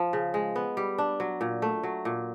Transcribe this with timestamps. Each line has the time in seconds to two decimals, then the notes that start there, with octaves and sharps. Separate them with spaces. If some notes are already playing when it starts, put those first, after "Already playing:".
Already playing: F3
0.13 C#3
0.34 G#3
0.56 B3
0.77 G3
0.98 D4
1.20 F#3
1.41 A#2
1.62 A3
1.83 F#3
2.05 A#2